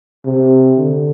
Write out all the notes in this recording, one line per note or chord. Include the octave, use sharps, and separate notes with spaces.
C3
D3